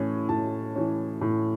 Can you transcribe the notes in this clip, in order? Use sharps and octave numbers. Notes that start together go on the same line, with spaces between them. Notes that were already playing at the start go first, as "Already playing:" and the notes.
Already playing: A2 E3 C#4
A2 A5
E3 C#4
A2